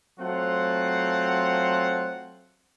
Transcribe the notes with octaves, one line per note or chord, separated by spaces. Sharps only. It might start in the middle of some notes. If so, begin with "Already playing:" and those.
F#3 A3 C4 F4 F#5